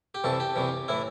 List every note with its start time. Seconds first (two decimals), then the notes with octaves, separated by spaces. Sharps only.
0.15 G4
0.24 C2 C3 E3 A4
0.40 G4
0.56 C2 C3 E3
0.88 A2 E3 E4